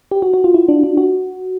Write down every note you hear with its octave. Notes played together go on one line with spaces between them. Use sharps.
G4
F#4
F#4
F4
E4
D4
D4
F#4